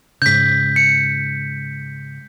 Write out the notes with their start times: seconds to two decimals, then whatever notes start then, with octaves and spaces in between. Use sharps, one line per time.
0.22 G#2 C#3 G6 B6
0.76 C#7